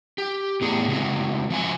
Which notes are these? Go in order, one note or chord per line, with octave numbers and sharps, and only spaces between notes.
G4
A2 B3 G#4
C#3 G#3 C4 F#4
F3 F#4 G#5